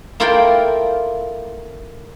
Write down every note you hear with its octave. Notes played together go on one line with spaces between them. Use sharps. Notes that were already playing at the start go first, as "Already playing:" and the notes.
A#3 E4 F4 A4 A#4 G5